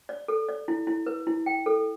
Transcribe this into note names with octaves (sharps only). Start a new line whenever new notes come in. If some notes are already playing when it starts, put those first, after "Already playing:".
D5
A4
D5
E4
E4
B4
E4
G5
A4